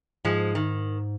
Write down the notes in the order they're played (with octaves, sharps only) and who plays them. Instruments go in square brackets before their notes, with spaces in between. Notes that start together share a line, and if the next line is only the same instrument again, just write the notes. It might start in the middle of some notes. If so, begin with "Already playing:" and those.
[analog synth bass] G#2 [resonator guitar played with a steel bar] F3 G#3
[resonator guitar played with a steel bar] D#3